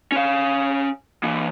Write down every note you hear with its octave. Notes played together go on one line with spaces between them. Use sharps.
C#4 F5
E3 A#3